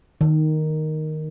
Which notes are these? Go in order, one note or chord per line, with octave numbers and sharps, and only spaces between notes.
D#3